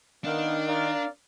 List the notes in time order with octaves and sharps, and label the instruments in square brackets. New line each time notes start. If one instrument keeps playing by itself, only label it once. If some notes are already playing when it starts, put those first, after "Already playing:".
[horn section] D#3 [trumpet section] B3 A#4 F5 [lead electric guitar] D4
[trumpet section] A#4 D5 F5